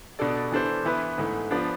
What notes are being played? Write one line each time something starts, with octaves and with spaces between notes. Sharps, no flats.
B2 B3 D4 A4 D5
E3 B3 D4 A4 C5
E3 B3 E4 B4
G#2 E3 A3
F3 B3 D4